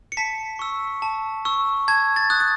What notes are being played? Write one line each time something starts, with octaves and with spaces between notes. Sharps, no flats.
C#7
A5 B6
C#6 E6
A5
C#6 E6
A5 G#6
A6
D#6 F#6
A6